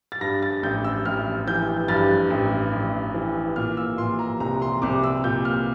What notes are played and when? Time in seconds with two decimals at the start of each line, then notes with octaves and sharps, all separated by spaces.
0.12 A6
0.21 G2 A#6
0.43 A6
0.63 A1 G6
0.84 E6
1.05 A1 F6
1.47 E3 G6
1.88 G2 A6
2.30 A1
2.73 A1
3.14 E3
3.56 A#2 F6
3.77 E6
3.98 A#2 C6
4.19 A#5
4.40 C2 A#5
4.62 C6
4.82 C2 D6
5.03 E6
5.24 A#2 G6
5.45 F6